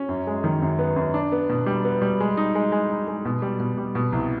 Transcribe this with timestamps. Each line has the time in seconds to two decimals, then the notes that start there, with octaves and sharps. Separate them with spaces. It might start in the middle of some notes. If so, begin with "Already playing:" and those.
Already playing: C#4
0.09 F#2
0.27 G#3
0.44 D#3
0.62 F#2
0.79 B3
0.96 F#2
1.14 D4
1.32 B3
1.49 B2
1.66 G3
1.85 B3
2.02 G3
2.20 G#3
2.37 D#4
2.55 G#3
2.72 G#3
2.90 D#4
3.08 G#3
3.25 B2
3.42 G3
3.60 B2
3.78 G3
3.95 B2
4.12 C2